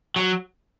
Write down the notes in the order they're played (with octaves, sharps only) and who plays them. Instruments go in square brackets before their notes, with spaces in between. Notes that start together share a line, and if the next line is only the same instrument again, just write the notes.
[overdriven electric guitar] F#3